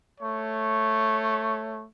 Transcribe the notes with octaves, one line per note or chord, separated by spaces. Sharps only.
A3 C#5